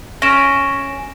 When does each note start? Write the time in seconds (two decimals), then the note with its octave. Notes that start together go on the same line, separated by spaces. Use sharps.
0.22 C#4 A#6 D7 E7